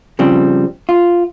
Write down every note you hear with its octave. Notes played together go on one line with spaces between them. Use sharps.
C#3 F3 G3 C4
F4